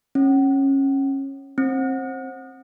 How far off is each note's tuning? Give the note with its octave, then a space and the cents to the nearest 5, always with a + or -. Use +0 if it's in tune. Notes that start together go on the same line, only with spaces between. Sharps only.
C#4 -20
C4 +25